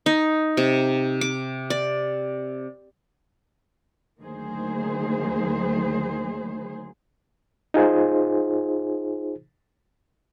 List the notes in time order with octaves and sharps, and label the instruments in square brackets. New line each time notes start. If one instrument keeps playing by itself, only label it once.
[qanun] D#4
C3
D6
D5
[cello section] D2 D#3 F#3 A#3 G#4 C5
[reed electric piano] D#4 F4 G#4 C5